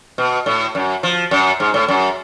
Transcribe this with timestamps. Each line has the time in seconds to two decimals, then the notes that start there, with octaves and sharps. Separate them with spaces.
0.18 B2
0.46 A2
0.75 F#2
1.03 F3
1.31 F#2
1.60 G#2
1.74 A2
1.88 F#2